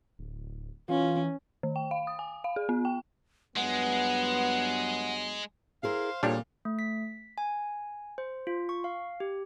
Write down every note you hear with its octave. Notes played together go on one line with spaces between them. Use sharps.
D1
E3 C#4 F4
D#3
G5
F5
D#6
G#5
F5
G#4
B3
G5
G2 F#3 G#3 B3 F#5
E4 G#4 A#4 C5 F5
E2 A#2 F3 G3 D4 F4 A4 C#5
A3
B6
G#5
C5
F4
C#6
F5
G4